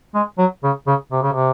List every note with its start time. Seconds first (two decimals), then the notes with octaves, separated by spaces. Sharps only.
0.15 G#3
0.38 F#3
0.64 C#3
0.87 C#3
1.12 C3
1.22 C#3
1.32 C3